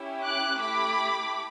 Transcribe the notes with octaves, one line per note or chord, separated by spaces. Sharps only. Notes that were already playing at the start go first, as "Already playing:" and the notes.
Already playing: C#4 E4 G4
D6 F#6
A3 E4 G4 B5 D6